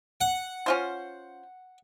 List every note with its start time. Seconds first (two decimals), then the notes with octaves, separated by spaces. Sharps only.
0.21 F#5
0.66 C#4 F4 C5